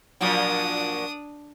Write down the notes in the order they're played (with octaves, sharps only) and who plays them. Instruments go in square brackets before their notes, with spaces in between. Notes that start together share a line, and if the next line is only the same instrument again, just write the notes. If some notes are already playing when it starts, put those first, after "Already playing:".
[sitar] A#2 F3 F#3 [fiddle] D4 D#6